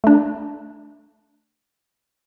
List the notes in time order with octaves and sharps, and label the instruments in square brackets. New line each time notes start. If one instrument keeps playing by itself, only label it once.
[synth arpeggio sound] A3 D4